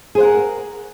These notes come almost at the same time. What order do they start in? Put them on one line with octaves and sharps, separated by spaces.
G#4 C5 F#5 A#4